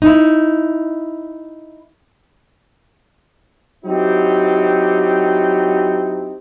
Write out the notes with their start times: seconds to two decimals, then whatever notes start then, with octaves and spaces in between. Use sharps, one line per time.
0.02 D#4 E4
3.85 F#3 C4 D#4 E4 G4